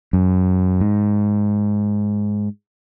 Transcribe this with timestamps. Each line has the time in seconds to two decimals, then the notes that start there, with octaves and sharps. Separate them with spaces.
0.13 F#2
0.80 G#2